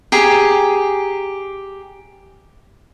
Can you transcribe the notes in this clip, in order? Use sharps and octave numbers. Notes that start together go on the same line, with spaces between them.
G4 G#4 A#5